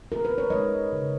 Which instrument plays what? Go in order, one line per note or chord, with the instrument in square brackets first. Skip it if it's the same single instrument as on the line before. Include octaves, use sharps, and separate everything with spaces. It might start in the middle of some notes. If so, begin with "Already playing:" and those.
[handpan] A#4
B4
C#5
G#3 D#5
C#3